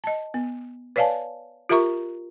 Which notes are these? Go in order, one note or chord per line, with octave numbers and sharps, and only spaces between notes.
D#5 A5
B3
B4 C#5 D5 F5 G#5 A5
F4 G4 A#4 E5 A#5 C#6